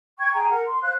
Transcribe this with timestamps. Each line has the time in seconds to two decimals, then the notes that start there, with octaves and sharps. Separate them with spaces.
0.19 G5 C#6 G#6
0.34 G#4 G5 G#5 A#5
0.50 A#4 F#5
0.67 C6
0.82 C5 F5 F#6